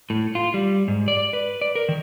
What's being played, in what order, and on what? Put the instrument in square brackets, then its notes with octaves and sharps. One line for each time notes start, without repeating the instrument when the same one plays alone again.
[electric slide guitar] A2
F4
G3
G#2
D5
B4
D5
A#4
D#3